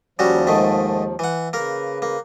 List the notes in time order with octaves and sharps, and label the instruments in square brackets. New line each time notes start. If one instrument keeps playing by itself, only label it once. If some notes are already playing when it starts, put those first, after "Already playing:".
[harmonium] D#2 F3 [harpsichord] C#3 G3 F#4
[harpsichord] G#2 D#3 A3
E3 F#5
[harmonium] C#3 B4 [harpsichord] A#3 A#4
[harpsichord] A#3